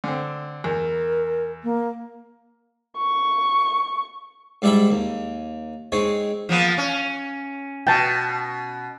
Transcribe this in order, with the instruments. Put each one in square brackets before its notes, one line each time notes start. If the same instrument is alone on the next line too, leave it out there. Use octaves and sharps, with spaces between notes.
[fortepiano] D3 C4
[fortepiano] E2 [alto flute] A#4
[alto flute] A#3
[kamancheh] C#6
[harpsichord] G#2 G3 D4 E4 E5 B5
D#2
G#3 C4 D#4 C#5
[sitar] F3 A#3 B3
C#4
[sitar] B2 [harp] G5 A5